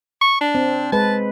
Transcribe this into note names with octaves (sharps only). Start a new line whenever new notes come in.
C#6
D4
C4
G#3 B4 A5